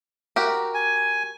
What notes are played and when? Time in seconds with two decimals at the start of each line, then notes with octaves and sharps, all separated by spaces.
0.36 F#4 G4 A#4
0.74 G#5